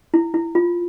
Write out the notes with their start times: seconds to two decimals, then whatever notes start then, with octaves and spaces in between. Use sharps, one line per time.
0.14 E4
0.34 E4
0.55 F4